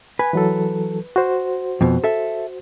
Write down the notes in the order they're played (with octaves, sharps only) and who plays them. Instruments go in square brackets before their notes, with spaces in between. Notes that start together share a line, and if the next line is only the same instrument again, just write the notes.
[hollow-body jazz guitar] B4 [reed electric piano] G#5
[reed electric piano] E3 F#3 A4
F#4 C5
[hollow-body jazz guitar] F2 B2
A4 E5